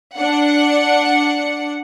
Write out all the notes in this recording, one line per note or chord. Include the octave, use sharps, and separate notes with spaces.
D4 F#5 C#7